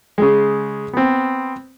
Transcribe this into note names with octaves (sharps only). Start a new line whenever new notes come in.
C#3 G#3
B3 C4